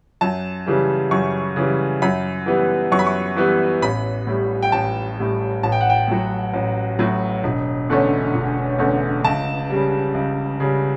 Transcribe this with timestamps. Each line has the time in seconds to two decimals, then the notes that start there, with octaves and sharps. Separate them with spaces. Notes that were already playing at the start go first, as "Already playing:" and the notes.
0.21 F#2 A5
0.66 C#3 E3 G3
1.11 F#2 C#6
1.56 C#3 E3 G3
2.02 F#2 B5
2.46 E3 G3 B3
2.92 F#2 C#6
2.99 B5
3.07 C#6
3.36 E3 G3 B3
3.82 A1 B5
4.27 A2 G3
4.63 G5
4.72 A1 A5
5.17 A2 G3
5.63 A1 A5
5.72 G5
5.81 F#5
5.90 G5
6.08 A2 F#3
6.54 A1
6.99 A2 F#3
7.44 E1
7.89 E2 D3 A3 C#4
8.34 E1
8.79 E2 D3 A3 C#4
9.24 C#2 A5
9.70 C#3 G3
10.14 C#2
10.60 C#3 G3